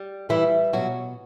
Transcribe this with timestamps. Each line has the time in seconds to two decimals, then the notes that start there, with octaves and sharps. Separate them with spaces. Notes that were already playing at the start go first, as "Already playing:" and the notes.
Already playing: G3
0.29 E3 G3 E4
0.73 B2 F#3 F#4